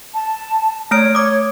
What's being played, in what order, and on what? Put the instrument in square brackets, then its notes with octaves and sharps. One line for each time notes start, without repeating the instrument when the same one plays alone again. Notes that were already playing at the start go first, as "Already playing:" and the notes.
[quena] A5
[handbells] A3 F6 D7 [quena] C#5
[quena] C#5 [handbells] D6 D#6